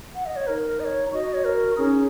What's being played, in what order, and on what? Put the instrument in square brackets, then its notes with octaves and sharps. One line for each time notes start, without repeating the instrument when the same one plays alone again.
[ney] F#5
D#5
C#5
[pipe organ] D#4 [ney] A#4
[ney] D#5
C#5
[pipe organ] F#4 [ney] D#5
[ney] C#5
A#4
[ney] C#4 [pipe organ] D#4 G#4